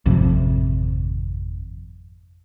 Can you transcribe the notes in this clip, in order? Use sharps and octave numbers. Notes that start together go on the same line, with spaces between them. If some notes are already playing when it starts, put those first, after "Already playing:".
G#1 F2 C3